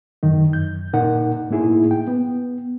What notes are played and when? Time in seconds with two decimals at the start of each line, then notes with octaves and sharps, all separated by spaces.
0.23 F#2 D#3 D#4
0.51 F#2 G6
0.93 A#2 D#4 A#4 F#5
1.50 A2 A#3 D#4 E4 G#4
1.91 G5
2.08 B3